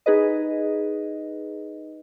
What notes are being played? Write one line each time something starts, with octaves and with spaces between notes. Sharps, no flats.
D#4 G#4 B4 D#5